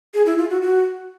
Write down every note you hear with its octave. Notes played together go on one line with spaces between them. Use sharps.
G#4
E4
F4
F#4
F#4